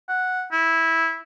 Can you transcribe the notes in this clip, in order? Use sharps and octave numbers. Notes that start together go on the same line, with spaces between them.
F#5
E4